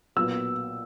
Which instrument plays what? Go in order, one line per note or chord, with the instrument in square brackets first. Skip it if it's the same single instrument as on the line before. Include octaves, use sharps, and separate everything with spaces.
[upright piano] B1 A#2 F#3 B3 E6